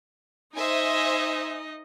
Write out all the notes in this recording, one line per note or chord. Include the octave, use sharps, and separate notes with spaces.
D#4 C5 D#5 E5 G#5